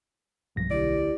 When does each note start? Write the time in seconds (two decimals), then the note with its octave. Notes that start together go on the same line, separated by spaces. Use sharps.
0.56 B1 G2 F3 G3 A#6
0.70 D2 E4 G4 D5